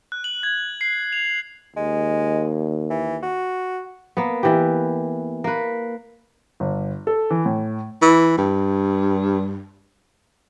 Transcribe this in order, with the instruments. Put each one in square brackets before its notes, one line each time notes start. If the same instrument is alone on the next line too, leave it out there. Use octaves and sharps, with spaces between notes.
[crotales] F#6
F#7
G#6
C7
F7
[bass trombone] D#2 [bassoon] G#3
[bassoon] E3
F#4
[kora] A#3 B3
E3 G4
A#3 B4
[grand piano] G1
A4
E3
A2
[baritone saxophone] E3
G2